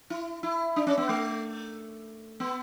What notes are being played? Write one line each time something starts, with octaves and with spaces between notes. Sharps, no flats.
E4
E4
D4
C#4
B3
A3
B3